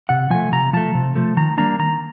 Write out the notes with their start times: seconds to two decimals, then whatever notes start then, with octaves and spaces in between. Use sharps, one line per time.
0.09 C3 F#5
0.30 F3 A3 G#5
0.52 C3 A#5
0.73 F3 A3 A5
0.95 C3
1.15 F3 A3
1.37 D#3 A#5
1.58 G3 A#3 D4 A#5
1.79 D#3 A#5